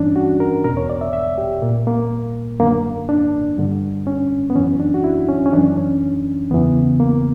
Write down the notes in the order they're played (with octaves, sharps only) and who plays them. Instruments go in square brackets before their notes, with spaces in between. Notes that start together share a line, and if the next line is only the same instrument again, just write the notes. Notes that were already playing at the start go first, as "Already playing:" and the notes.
Already playing: [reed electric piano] G2 E3 C#4 D4
F#4
A#4
E2 B2 A#4
C#5
D5
E5
E5
G4
A#2 A#3
A#3
F#2 D3 A#3
D4
G2 D3
C#4
B3
F#2 E3 C#4
D4
F#4
E4
C#4
C#4
F#2 E3 D4
C#4
E2 C#3 E3 B3
A#3